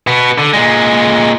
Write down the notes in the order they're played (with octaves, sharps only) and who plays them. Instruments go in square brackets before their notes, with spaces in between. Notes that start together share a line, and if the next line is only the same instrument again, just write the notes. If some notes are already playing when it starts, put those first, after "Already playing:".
[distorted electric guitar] B2 B3
D3
A#2 G#3